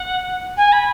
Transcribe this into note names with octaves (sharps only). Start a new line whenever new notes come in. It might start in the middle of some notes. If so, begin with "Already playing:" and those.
Already playing: F#5
G#5
B5